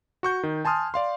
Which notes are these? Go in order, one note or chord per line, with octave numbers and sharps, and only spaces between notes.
F#4 C#6 G6
D#3
G#5 A5 C6 D#6 F6
D5 F5 C6